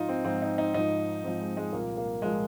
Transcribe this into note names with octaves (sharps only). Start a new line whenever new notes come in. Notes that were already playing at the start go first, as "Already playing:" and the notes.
Already playing: G#2 F3 D#4 F4
C4
G#2 F3 C4
D#4
D#4
G#2 F3 D#4
G#2 F3 C4
G#3
G#3
C2 A#2 F3 A#3
A#3
A#2 F3 G#3